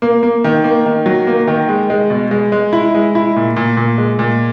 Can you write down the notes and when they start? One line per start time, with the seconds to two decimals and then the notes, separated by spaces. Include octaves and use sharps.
0.02 A#3
0.23 A#3
0.44 D#3
0.64 A#3
0.86 D#3
1.06 F#3
1.27 A#3
1.47 D#3
1.69 G#3
1.90 G#3
2.10 B2
2.31 G#3
2.52 G#3
2.73 E4
2.94 G#3
3.15 E4
3.36 A#2
3.57 A#2
3.77 A#2
3.98 G#3
4.19 A#2